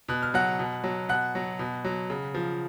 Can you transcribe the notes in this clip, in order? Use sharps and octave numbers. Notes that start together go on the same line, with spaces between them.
B2 F#6
F6
F#3 F#5 F#6
B2
F#3
B2 F#5 F#6
F#3
B2
F#3
C#3
F3